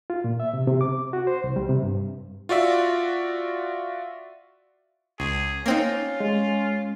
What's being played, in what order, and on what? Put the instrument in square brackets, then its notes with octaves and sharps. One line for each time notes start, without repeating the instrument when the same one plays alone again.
[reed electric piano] F4
A#2
E5
C3
C3
D6
F#4
C5
C2
G3
C3
G2
[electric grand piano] F4 F#4 D5 E5
[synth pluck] C#2 [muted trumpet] G#4
[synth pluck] A#3 C4 D#4 [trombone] C#4 [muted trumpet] F4
[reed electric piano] G#3